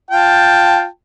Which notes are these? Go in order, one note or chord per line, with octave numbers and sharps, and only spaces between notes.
F4 G5 A5